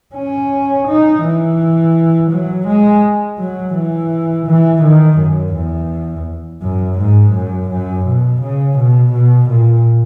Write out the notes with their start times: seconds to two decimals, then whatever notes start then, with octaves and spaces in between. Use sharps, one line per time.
0.15 C#4
0.88 D#4
1.24 E3
2.31 F#3
2.67 G#3
3.39 F#3
3.75 E3
4.47 E3
4.83 D#3
5.19 F#2
5.54 E2
6.62 F#2
6.99 G#2
7.34 F#2
7.70 F#2
8.06 B2
8.42 C#3
8.78 B2
9.13 B2
9.50 A#2